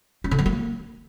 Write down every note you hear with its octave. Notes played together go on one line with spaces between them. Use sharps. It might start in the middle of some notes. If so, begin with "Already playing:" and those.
C#4
D3
F#3
A#3